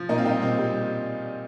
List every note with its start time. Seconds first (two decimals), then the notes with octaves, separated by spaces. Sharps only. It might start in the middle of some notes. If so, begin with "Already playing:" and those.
Already playing: F3
0.09 A#2 A#3 D#4
0.18 C4 F4
0.25 G3 D#4 G4
0.42 A#2 C4
0.58 G3